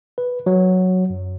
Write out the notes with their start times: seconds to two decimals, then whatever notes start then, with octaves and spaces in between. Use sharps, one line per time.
0.18 B4
0.46 F#3
1.10 F#2